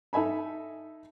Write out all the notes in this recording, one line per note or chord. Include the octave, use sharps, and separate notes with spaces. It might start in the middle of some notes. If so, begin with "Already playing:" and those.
D#4 A4 E5 G#5 B5